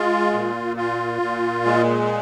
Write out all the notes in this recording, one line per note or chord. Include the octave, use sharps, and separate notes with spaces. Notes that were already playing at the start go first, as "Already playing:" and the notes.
Already playing: G#3 F4
A#2
F4
A#2
G#3